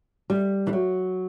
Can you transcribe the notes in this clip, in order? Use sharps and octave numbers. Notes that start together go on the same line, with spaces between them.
G3
E3
F#3